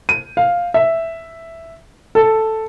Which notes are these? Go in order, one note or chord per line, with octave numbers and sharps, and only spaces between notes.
D#7
F5
E5
A4